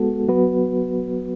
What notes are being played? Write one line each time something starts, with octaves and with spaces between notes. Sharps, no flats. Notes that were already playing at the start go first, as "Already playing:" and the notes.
Already playing: G#3 B3 F#4 A4
F#3 B3 F#4 B4